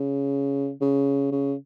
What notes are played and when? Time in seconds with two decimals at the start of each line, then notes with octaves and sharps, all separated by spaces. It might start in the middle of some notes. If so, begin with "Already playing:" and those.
Already playing: C#3
0.81 C#3
1.32 C#3